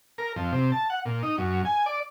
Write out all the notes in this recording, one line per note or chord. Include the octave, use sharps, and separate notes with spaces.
A#4
F2
C3
A5
F#5
A#2
D#4
F#2
G#5
D5